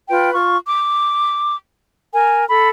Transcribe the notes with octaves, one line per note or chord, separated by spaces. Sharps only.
F4 B4 G5
F4 C#6
D6
A#4 G#5
A4 B5